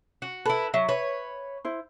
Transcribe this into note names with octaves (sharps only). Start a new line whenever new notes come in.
F#4
E4 A4 B4
F#3 E5
B4 C#5
E4 C5